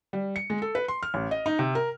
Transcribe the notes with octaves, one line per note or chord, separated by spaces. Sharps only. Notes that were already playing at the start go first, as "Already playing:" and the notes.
G3
C#7
G#3
A4
B4
C6
F6
A1
D#5
D#4
C3
A#4